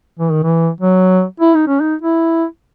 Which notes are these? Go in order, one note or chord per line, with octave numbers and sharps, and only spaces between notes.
E3
D#3
E3
F#3
E4
D#4
C#4
D#4
E4